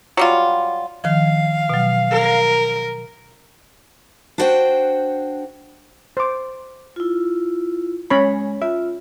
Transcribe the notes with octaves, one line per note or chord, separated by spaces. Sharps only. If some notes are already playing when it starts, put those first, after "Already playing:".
F#3 G3 F4
D#3 F3 F5
B2 F#3
A#4
D4 E4 F#4 C5 F#5 G5
C5 D6
E4 F4
G#3 C#4 C#5 B5
F4 E5